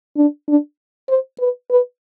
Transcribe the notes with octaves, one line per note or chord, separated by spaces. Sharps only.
D4
D4
C5
B4
B4